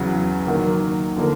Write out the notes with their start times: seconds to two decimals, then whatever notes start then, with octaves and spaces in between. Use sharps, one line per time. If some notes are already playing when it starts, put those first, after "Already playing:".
Already playing: E2 C#3 F#3
0.46 D#3 F#3 A#3
1.16 D3 F3 A#3